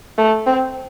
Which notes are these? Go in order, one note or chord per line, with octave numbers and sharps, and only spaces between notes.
A3
C4